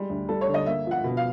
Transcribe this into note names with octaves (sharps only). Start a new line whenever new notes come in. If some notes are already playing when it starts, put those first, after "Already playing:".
Already playing: G3 G#3
D2
G3 A4
C#5
D3
D#5
A#3 E5
F3
F#5
B2
F5